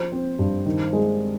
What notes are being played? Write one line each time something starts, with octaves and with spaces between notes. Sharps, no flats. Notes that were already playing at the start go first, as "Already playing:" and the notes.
Already playing: F3 C5
C4
G2
D#3
G#3